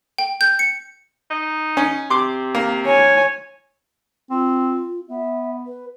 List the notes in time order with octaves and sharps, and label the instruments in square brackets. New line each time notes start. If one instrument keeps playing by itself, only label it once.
[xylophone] G5
G6
C#7
[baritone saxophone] D#4
[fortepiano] C#4
[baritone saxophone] C3 [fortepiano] C6 D6
[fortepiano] A#3
[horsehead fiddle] C#5 G#5
[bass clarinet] C4 [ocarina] F4
[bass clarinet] B3 [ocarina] E5
[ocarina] B4